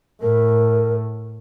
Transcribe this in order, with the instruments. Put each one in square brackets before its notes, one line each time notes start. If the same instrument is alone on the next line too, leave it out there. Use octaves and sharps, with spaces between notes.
[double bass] A2 [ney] A#4